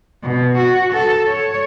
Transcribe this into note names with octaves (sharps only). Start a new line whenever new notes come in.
B2
F#4
A4
C#5